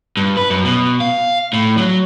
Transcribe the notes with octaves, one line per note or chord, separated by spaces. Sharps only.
G2
B4
F#2
B2
F5
A2
F#3